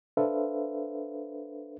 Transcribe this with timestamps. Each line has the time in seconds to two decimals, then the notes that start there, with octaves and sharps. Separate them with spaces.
0.17 D4 A4 B4 C5 E5 F5